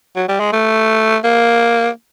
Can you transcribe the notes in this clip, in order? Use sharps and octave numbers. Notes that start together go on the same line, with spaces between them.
F#3
G3
G#3
A3
A#3